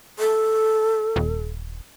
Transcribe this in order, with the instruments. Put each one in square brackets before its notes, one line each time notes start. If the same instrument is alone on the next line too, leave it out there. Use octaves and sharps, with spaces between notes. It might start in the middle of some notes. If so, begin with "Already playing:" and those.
[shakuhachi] A4
[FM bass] D#1